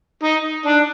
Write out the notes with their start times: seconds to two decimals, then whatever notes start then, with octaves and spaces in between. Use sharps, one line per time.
0.23 D#4
0.66 D4